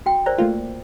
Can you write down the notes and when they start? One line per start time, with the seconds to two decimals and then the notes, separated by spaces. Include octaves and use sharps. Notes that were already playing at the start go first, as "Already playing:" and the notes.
0.06 F#4 G5
0.26 A#4 C5 D5 A#5
0.38 A3 A#3 F4